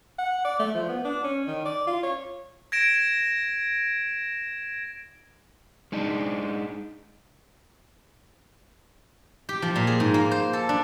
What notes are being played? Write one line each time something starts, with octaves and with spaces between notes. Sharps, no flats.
F#5
D5
A3
F3
B3
D4
C#4
D#3
D5
F4
C#5
G#6 A#6 D7 E7
G#3 D4 D#4
G4
F3
A#2
G#4
G#2
A#3
C5
A4
D4